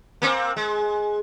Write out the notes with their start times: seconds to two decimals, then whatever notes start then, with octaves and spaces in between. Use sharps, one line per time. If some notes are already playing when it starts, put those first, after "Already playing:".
0.22 A#3 C4
0.56 G#3